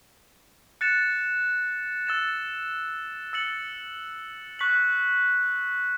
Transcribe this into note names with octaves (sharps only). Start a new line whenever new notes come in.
F#6 A6 C#7 E7
E6 A6 E7
E6 A6 C#7 F#7
C#6 F#6 B6 F#7